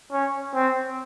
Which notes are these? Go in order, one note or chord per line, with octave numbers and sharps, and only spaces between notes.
C#4
C4